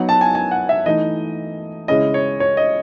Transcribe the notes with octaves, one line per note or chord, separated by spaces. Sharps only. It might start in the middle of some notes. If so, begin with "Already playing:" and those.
Already playing: F#3 B3 D#4 F#5
A5
G#5
G#5
F#5
E5
E3 A3 D#4 D#5
C#3 G#3 C#4 E4 D#5
C#5
C#5
D#5